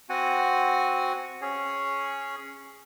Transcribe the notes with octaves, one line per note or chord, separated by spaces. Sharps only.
C4 F#4 F#5 G#5
C#4 G#4 C#5